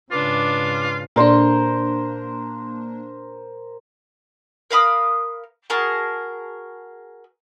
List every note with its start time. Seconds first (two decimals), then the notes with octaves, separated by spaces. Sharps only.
0.11 G#2 C#3 D4 F4 B4 D6
1.16 A#2 A#3 D4 A#4 C5 D5 C6
4.71 A#4 F5 B5 D#6
5.70 F#4 G#4 A#4 A5